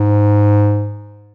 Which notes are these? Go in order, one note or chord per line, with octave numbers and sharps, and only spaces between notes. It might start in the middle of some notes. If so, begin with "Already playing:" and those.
Already playing: G#2